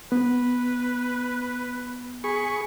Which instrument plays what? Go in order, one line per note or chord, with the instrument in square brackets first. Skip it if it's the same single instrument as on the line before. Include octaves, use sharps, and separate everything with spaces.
[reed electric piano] B3 [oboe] B4
[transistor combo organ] G#4 C#6 [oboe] B5